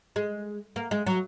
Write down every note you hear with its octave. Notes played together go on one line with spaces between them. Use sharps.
G#3
A#3
G#3
F#3